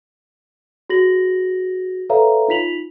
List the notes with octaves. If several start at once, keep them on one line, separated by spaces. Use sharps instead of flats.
F#4 G#4 A#6 F#7
A4 B4 C#5 E5 F5 A#5
D#4 F4 B6 F7 F#7